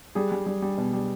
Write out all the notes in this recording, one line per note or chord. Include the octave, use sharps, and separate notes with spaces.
G3 G#4
G3
G3
G3
B2
G3